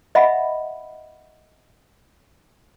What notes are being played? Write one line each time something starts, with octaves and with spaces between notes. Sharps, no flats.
D#5 E5 F#5 B5